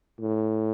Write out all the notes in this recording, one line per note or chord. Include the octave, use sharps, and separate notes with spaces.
A2